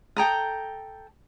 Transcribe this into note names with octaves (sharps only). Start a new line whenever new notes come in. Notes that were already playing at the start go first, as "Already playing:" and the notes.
A4 G5 A#5 D#6